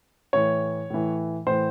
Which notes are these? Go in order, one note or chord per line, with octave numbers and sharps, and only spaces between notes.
A2 E3 C#5
A2 E3
A2 E3 C5